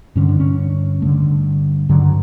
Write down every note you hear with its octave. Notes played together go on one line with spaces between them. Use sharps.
G2 D3 C#4
D4
C#4
G2 D3 A3
G2 D3 F#3